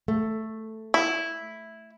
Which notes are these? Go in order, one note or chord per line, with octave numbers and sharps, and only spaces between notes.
A3
E4